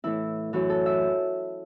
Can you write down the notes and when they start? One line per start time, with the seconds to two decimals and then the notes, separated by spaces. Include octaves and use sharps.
0.04 A2 E3 E4
0.53 F#2 E3 F#4
0.69 A4
0.86 E5